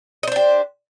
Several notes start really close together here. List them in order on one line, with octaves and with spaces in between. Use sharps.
D#5 C5 D4 G4